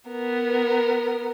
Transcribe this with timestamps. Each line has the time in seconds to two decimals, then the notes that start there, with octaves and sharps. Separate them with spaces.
0.10 B3 A#4